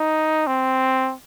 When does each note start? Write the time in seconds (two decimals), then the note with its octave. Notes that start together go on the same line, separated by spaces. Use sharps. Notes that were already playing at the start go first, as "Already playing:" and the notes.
Already playing: D#4
0.47 C4